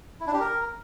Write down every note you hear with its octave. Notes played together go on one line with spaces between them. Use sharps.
E4
D4
G4
A#4